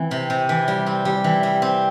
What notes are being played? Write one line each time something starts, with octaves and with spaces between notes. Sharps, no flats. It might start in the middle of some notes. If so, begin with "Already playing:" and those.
Already playing: E3 C4
C3
C3
E3
G3
C4
G3
E3
G3
C4